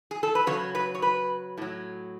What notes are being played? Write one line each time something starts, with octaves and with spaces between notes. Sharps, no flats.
G#4
A4
B4
C#3 F#3 C#5
B4
C#5
B4
A2 F#3